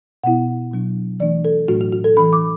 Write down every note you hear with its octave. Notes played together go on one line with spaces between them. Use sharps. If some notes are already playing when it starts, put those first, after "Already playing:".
B2 B3 E4 F#5
B2 F#3 D4
E3 A3 D4 D5
A4
A2 F#3 A3 D4 F#4
F#4
F#4
A4
E3 D4 B5
D6